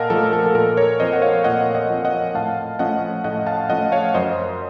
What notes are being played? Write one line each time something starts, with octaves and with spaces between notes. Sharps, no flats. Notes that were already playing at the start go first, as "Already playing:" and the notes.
Already playing: A#2 A#4 D#5 F5 F#5 A5
F3 A3 A4
A4
A4
A#2 A#4
A#4 C#5
F3 C4 C5 D#5
F#5
C#5 F5
A#2 D#5 F#5
D#5 F#5
F3 C4
D#5 F#5
A2 F5 A5
F3 A3 C#4 D#5 F#5
A2 D#5 F#5
F5 A5
F3 A3 C#4 D#5 F#5
C#5 F5
F#2 C5 D#5